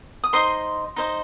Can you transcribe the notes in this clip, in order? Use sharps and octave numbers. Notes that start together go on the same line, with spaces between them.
D#6
D#4 C5 D#5 C6
D#4 C5 D#5